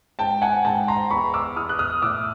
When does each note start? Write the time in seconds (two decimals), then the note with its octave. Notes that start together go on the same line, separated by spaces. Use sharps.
0.19 G#2 G5 A5
0.42 F#5 G#5
0.65 G#2 G5 A5
0.88 A#5 C6
1.10 E2 B5 C#6
1.34 D6 E6
1.56 E2 D#6 F6
1.69 F#6
1.79 D#6 F6
2.02 A2 D6 E6